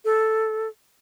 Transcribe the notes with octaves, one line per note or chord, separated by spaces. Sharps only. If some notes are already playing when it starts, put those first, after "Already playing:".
A4